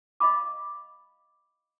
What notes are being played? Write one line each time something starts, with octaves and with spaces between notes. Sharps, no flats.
D#5 F5 B5 D6